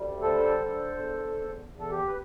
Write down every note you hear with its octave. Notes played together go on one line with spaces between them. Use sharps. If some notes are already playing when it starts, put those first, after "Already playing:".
Already playing: D2 G3
D3 A4 C5
D3
E2
E2
E2
A4
G4
B4